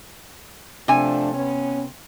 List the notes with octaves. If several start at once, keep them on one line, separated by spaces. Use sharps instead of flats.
C3 F3 A3 D4 G#5
B3 C#4